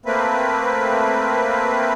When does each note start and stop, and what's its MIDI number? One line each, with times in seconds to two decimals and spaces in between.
0.06 1.93 57
0.06 1.93 58
0.06 1.93 60
0.06 1.93 71